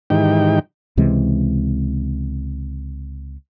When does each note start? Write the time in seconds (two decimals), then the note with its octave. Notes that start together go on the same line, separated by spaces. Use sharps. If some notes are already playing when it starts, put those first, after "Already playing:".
0.10 G#2 D#3 E3 D#4 G4 G5
0.97 C#2 C3 E3 G#3